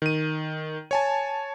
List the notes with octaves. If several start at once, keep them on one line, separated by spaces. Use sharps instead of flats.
D#3 D#7
C#5 G#5 A5